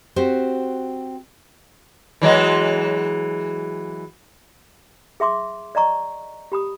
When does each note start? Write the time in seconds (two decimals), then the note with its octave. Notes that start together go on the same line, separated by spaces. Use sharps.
0.16 C4 F#4 G4 C5
2.22 E3 F#3 G#3
5.20 G#4 E5 C6 D6
5.75 D5 D#5 A#5 C#6
6.52 G4 B5 D#6